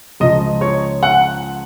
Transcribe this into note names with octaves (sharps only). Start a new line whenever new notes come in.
C#2 C#3 F3 D#5
C#5
F#5